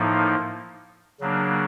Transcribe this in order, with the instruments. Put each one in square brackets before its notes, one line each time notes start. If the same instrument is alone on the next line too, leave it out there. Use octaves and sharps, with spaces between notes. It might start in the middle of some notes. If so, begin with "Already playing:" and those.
Already playing: [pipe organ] A2 F3 A#3 D#4
C#3 F#3 A#3 D4